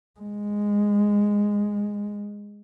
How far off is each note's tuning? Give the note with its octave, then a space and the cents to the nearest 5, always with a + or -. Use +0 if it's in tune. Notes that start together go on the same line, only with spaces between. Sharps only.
G#3 -10